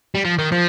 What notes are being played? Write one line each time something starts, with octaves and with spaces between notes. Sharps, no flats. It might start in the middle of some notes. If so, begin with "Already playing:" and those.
G3
F3
D#3
F3